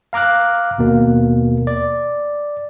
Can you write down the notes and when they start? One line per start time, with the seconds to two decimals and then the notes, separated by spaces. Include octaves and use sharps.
0.13 F5 A#5 D6 F6 F#6
0.78 D#2 B2 A#3
1.67 D5